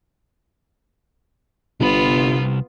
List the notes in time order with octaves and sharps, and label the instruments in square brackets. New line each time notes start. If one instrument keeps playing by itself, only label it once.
[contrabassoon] G1 [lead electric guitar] C2 B5 [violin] B3 F4